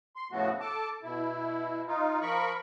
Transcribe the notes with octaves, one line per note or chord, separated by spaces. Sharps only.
C6
A2 C#3 F3 A3 B3 F#4
A4 A5 D6
B2 E4
D#4 F4
F3 A#4 B5 C#6